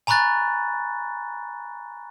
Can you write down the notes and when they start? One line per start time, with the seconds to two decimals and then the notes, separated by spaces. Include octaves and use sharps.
0.07 G#5 A#5 B5 C#6 F#6 A6